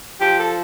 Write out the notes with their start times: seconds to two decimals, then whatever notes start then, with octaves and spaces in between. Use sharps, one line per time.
0.21 F3 G4
0.39 A4